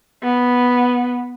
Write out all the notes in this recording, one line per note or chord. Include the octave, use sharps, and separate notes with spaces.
B3